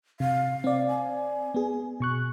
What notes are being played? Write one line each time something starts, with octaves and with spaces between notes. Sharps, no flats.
C3 F5
C4 D5
G#5
B3 G#4
B2 C#6 F#6